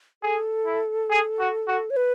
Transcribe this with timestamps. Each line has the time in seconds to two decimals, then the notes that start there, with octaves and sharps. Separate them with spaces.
0.23 G#4 A4
0.66 E4
1.10 G#4
1.40 F#4
1.68 F#4
1.90 C#5
1.96 B4